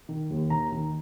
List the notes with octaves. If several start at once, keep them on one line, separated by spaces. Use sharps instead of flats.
D#3
D#2
D#3 A#5
D#3